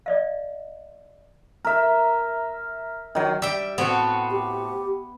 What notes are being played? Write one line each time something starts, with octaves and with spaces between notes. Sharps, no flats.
D5 D#5 F5
A#4 E5
D#3 F#3
G3 E5 G5
A2 B3 C4 F#4
G4